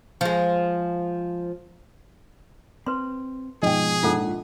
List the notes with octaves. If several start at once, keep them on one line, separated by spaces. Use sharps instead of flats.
F3 G#3
C4 B4 C6
G#2 B2 F3 G#4 D#5 G5
A#1 G#2 F4 A4 F#5 A5